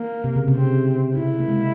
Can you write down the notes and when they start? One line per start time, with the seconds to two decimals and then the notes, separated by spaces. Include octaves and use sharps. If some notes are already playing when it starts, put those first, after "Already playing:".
Already playing: A#3
0.24 C3
0.36 C#3
0.48 C3
0.55 C4
1.17 C3 E4
1.40 A#3
1.48 G#3
1.58 C3